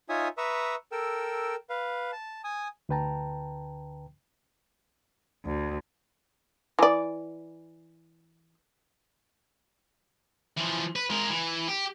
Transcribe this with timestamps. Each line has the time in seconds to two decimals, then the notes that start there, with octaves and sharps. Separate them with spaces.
0.09 D#4 F4 C#5 E5 G#5 D#6
0.38 B4 E5 A#5 C#6 D#6 E6
0.92 A4 A#4 G5 E6
1.70 B4 F5
2.12 A5
2.44 G#5 D#6
2.89 D2 D3 B4 G5 A5 A#5
5.45 D2
6.79 E3 D5
10.57 E3 F3
10.96 B4
11.10 G#3 A#4
11.30 E3
11.68 G4